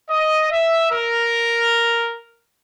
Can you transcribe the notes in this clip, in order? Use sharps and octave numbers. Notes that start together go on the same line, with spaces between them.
D#5
E5
A#4